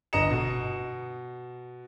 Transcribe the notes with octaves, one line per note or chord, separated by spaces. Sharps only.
G1 D#5 A#5 C#7 E7
B2